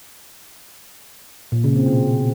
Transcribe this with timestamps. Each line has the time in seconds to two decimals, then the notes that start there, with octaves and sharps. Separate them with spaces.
1.52 A#2
1.64 C#3
1.76 C4
1.88 B2